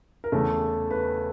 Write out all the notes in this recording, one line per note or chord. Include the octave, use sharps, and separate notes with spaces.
A#4
E2 C#3 E3 A3 A4
B4